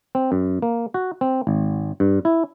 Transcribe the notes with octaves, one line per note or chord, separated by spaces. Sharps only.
C4
F#2
A#3
F#4
C4
G#1
G2
E4